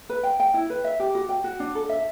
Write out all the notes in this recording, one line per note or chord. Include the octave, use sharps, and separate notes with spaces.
B4
G5
G5
E4
B4
E5
G4
F#4
G5
F#4
D4
A4
E5